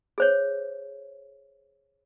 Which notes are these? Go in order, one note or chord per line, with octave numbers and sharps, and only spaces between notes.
G#4 C5 C#5